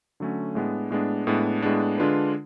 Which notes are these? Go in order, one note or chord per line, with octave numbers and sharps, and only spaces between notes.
D3 F#3 A3 C#4
A2 G#3 B3 D4
A2 G#3 B3 D4
A2 G#3 B3 D4
A2 G#3 B3 D4
D3 G#3 D4 F4 B4